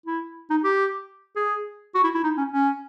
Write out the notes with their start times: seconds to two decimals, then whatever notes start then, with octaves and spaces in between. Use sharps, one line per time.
0.06 E4
0.50 D#4
0.64 G4
1.36 G#4
1.95 F#4
2.04 E4
2.14 E4
2.24 D#4
2.38 C#4
2.52 C#4